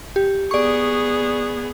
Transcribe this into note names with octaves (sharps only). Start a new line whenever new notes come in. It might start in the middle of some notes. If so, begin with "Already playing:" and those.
G4
B3 G#4 D5 C#6